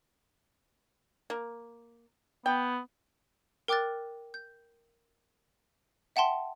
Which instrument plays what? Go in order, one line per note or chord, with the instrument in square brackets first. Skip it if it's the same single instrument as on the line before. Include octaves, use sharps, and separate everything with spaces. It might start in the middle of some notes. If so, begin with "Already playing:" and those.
[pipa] A#3
[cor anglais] B3 [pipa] G5
[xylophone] A#4 G5 D6 F6 F#6 A6
G6
E5 F#5 G5 A5 C6